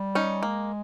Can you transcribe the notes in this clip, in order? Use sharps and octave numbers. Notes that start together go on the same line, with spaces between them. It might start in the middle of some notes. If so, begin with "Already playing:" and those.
Already playing: G3
C#4 D#4
G#3 A#3